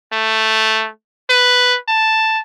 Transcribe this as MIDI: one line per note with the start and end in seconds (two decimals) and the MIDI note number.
0.12 0.89 57
1.29 1.78 71
1.88 2.40 81